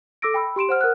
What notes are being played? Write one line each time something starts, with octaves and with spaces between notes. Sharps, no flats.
A4 D6 E6 A#6 D7
G5 B5 E6
G4 C6 D7 E7
C5 F#5 F6
A#4 F#5 F6 F#6